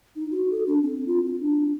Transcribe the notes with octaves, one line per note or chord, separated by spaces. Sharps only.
D#4
F#4
A4
D4
C4
F4
F4
D4